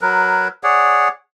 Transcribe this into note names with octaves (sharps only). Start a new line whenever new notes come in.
F#3 A#4 B4
G#4 C#5 D5 F#5